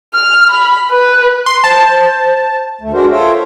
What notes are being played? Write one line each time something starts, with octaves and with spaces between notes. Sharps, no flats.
F6
B5
B4
C6
C5 A5
D2 A3
G#3 D4 F#4 A#4 C5
F4 A4 C5 C#5 E5 G5